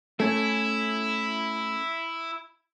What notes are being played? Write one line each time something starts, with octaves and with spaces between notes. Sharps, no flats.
A3 C#4 E4